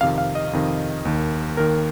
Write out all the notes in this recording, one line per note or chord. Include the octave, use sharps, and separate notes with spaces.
F2 C3 D#3 F5
F5
D#5
F2 C3 D#3
D#2 D#3
D#2 D#3 A#4